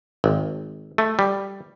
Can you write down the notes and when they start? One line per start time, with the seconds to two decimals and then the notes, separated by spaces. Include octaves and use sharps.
0.24 G#1
0.98 A3
1.19 G3